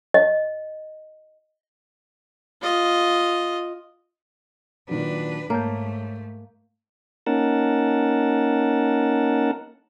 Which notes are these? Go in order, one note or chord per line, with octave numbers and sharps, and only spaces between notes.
D#5
F4 D#5
A#2 D#3 F#3 D4 B4
G#2 A3 A#3 C#5 A5 G6
A#3 C#4 D#4 A#4 F#5 A5